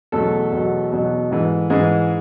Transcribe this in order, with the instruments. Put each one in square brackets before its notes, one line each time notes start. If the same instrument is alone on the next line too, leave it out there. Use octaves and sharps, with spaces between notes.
[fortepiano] E2 B2 F#3 A3 A4
E2 B2 F#3
E2 B2 F#3
G#2 E3
G#2 E3 G#3 G#4